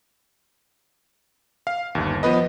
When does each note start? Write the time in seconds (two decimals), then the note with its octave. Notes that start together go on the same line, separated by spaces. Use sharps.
1.67 F5
1.95 G1 D#2
2.23 F3 B3 B4 D#5